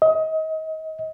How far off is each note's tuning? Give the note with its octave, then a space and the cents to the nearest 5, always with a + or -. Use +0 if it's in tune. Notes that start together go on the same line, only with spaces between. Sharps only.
D#5 +30